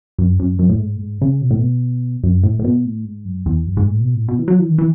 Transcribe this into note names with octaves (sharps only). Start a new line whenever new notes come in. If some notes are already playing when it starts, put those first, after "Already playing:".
F#2
F#2
F#2
A2
G#2
A2
G#2
C#3
B2
A2
B2
F#2
A2
A2
B2
A2
G#2
F#2
E2
F#2
G#2
A2
B2
A2
B2
E3
F#3
E3
D#3
E3